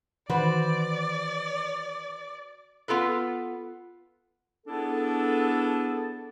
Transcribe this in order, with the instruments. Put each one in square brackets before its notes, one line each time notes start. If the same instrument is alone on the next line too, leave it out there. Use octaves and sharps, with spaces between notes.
[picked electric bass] D#3 E3 [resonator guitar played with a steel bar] F#4 B4 C5 [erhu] D5
[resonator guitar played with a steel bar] B3 F4 A4 B4
[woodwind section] B3 D4 E4 G#4 A4